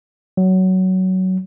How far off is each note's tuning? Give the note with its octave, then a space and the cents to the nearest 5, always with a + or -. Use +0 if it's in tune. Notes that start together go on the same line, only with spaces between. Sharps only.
F#3 +15